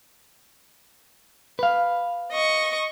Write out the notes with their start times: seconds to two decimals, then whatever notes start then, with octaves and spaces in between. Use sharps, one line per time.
1.59 B4 F5
2.31 D#5 C#6